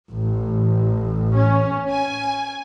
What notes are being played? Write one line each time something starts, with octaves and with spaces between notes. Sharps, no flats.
A1
C#4
G#5